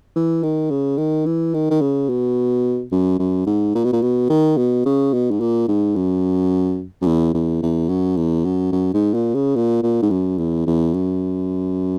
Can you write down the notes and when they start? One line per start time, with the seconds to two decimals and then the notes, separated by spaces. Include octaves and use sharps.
0.16 E3
0.43 D#3
0.70 C#3
0.98 D#3
1.26 E3
1.54 D#3
1.71 D#3
1.81 C#3
2.09 B2
2.92 F#2
3.19 F#2
3.47 G#2
3.75 A#2
3.84 B2
3.93 A#2
4.02 B2
4.30 D#3
4.57 B2
4.86 C#3
5.14 B2
5.31 G#2
5.40 A#2
5.68 G#2
5.96 F#2
7.02 F#2
7.07 E2
7.34 E2
7.62 E2
7.89 F#2
8.17 E2
8.45 F#2
8.72 F#2
8.94 G#2
9.14 A#2
9.35 C#3
9.56 A#2
9.83 A#2
10.02 G#2
10.10 F#2
10.38 E2
10.67 E2
10.94 F#2